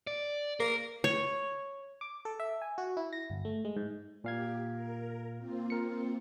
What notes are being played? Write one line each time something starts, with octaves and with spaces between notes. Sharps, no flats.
D5
A#3 A#4
C#5
D6
A4
E5
G#5
F#4
E4
A#6
G1
A3
G#3
G#2
A#2 G4 F5 G#6
A#4
A#3 C4 F4
A#4 C#7